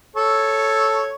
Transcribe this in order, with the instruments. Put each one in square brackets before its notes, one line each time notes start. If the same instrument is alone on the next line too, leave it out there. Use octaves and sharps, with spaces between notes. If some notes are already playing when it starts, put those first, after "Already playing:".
[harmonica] A4 C#5